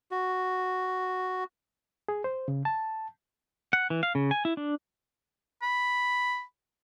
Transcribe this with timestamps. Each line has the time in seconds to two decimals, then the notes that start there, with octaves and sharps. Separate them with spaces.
0.11 F#4
2.09 G#4
2.24 C5
2.48 C#3
2.65 A5
3.73 F#5
3.90 E3
4.03 F5
4.15 C#3
4.31 G#5
4.45 E4
4.57 D4
5.62 B5